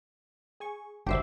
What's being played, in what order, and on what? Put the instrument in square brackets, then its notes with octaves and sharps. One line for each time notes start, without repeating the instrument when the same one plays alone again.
[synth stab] G#4 G#5 C#6
[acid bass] G1 [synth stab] D4 F#4 C#5 [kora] G4 C5 E5